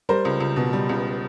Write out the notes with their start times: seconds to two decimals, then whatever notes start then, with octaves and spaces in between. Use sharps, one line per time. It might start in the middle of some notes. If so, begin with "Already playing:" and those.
0.09 G3 A#4 C5
0.25 C#2
0.40 C#2
0.56 B2
0.73 G3
0.89 C#2